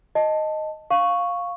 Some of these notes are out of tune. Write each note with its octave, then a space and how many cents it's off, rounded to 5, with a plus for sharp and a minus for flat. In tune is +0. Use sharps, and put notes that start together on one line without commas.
D#5 +0 A5 +0
F5 +10 C#6 +0